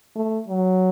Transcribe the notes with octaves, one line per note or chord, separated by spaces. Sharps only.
A3
F#3